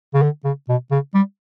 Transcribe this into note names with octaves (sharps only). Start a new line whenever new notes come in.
C#3
D3
C#3
B2
C#3
G3